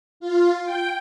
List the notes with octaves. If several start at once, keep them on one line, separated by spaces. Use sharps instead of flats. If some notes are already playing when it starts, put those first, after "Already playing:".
F4
G5